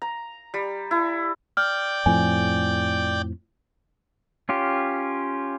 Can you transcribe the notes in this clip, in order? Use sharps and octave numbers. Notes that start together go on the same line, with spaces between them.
A#5
G3
E4
D5 G5 F6
F2 A2 F3 G#5
C#4 F4 G4